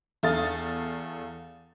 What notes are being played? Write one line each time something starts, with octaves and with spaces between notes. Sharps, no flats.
E2 A4 F5 D#6 A6